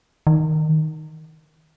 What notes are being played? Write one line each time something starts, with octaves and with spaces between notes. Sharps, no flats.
D#3